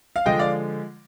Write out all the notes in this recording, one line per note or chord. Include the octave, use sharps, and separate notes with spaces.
F5
D3 F3 G#3 D#5 G5
D5 F5